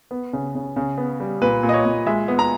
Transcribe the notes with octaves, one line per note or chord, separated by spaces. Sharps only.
B3
C#3
C#3
C#3
B3
G3
A#2 B4
A#2
D#5
C#5
A#2
G#3 E5
B3
A#5